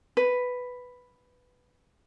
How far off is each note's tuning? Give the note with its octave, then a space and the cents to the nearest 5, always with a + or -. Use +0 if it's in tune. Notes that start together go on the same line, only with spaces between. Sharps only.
B4 +5